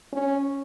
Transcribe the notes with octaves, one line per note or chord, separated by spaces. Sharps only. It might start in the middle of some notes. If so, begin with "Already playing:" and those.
C#4